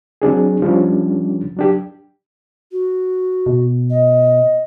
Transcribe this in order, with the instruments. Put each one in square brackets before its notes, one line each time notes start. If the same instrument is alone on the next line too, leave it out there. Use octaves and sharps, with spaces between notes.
[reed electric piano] F#3 C4 D4 G#4
F3 G3 C#4 D4
F#3 D4 G4
[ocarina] F#4
[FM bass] B2
[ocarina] D#5